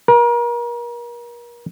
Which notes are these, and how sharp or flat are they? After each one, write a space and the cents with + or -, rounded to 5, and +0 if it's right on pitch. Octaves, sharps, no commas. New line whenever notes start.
A#4 +35